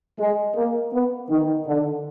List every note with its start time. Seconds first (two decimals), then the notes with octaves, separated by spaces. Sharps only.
0.19 G#3
0.55 A#3
0.93 B3
1.30 D#3
1.66 D3